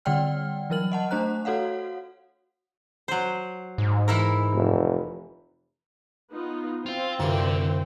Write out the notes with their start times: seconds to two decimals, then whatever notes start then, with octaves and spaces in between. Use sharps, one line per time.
0.05 D3 G3 D5 F#5 G5 F6
0.70 E3 F#3 A#4 F6 F#7
0.92 D#5 F#5 A5
1.11 A3 D4 C5 A#5 F#6
1.45 F#4 A4 C#5 F5 F#5
3.08 F#3 C5
3.78 G#2
4.08 E3 E4 A#4
4.54 F1
6.31 B3 D#4 F4
6.86 C4 F4 C5 F5 G5
7.20 C2 F#2 D3 E3 F4